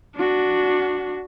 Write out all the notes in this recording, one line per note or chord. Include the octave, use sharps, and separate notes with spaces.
D4 F#4